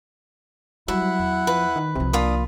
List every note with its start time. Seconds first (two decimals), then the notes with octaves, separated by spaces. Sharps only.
0.88 F#3 G3 E4 E5 F#5
1.19 E2
1.47 F3 B4
1.76 D#3
1.95 C2 C3 F3
2.13 A#3 D4 F4 B5 D#6